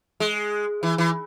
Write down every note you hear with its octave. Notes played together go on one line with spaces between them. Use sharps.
G#3
E3
E3